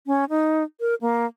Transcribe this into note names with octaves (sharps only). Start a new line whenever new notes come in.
C#4
D#4
A#4
A#3